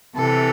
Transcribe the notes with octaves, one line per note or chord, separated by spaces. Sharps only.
C3 E3 A4